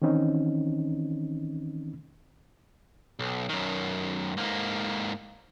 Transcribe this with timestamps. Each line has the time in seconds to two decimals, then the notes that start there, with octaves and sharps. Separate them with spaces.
0.02 D#3 E3 C4 C#4 D#4
3.19 B1
3.49 F#2 D#3
4.37 G#2 A#3